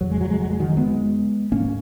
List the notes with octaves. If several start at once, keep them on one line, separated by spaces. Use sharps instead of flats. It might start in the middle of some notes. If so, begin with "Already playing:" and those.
F2 C#3 F#3
G#3
F#3
G#3
F#3
G#3
D#3 F#3
G#3 B3
G#2 A#3 C#4